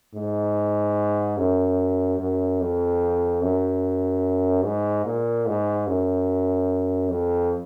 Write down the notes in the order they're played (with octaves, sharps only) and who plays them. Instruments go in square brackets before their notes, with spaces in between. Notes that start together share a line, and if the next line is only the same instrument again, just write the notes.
[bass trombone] G#2
F#2
F#2
F2
F#2
G#2
A#2
G#2
F#2
F2